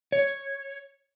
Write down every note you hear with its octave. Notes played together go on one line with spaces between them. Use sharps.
C#5